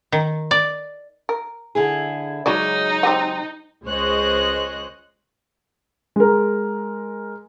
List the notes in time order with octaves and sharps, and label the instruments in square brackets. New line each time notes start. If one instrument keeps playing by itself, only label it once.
[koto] D#3
D5
[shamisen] A#4
[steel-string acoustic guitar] D3 E4 G#4
[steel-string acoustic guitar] C#3 F#3 G#3 [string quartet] D#4 [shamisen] F#4 C#5 D5
[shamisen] C4 G4 F#5
[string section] C#2 G#3 C5 C#5 D#5 F#6
[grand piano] G#3 A#4